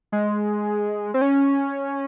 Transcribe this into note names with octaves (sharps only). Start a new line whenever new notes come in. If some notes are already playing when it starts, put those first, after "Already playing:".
G#3
C4
C#4